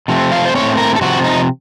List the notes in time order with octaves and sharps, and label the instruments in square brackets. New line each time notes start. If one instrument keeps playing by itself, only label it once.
[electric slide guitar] C3 F3 A3 C4
F5
C5
A2 A3 C4 C#5
A#4
A4
C3 F3 C4 F#4
D#4